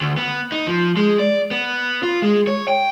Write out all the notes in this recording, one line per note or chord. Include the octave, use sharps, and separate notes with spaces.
D2
B3
D#4
F3
G#3
D5
B3
F4
G#3
C#5
G5